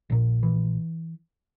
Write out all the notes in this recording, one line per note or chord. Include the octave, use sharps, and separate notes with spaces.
A#1 A#2
E3